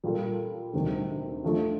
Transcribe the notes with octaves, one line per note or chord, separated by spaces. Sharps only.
A#2 G3 A#3 F4 A4
D2 C3 D#3 G3
D3 F3 A3 D#4